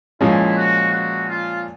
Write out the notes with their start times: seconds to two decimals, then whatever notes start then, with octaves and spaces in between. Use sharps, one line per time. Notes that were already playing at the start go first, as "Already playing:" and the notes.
0.21 A#2 F3 G#3 C#4 E4
0.56 F#4
0.92 F#4
1.29 F4